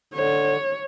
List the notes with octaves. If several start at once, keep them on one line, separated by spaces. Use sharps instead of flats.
D3 C#5